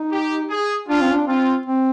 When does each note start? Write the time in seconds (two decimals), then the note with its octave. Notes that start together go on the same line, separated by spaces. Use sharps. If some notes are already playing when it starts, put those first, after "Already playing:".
Already playing: D#4
0.11 G4
0.50 G#4
0.88 D4 F4
1.01 C4
1.13 D4
1.27 C4 F4
1.66 C4